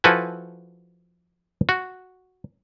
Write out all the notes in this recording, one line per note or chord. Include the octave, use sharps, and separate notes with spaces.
F3 E4 F#4 A4 B4 G#5
F#4